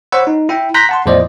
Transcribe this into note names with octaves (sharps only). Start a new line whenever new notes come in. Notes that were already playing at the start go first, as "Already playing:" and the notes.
C5 C#5 F#5 B5 E6
D#4
E4 E5 G5
A#5 C6 F#6 G6 A#6 B6
F#5 A5 C6
E2 A2 F3 C5 D5 D#5